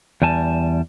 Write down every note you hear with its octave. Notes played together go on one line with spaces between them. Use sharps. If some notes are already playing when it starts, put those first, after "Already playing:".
E2 G3 G#5 A5